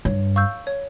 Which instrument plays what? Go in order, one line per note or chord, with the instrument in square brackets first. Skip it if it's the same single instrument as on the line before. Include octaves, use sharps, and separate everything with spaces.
[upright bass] G2 [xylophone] C#5
[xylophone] F5 C#6 E6 G6
C#5